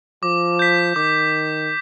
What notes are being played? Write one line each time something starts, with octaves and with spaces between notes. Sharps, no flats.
F3 D6
G6 B6
D#3 D6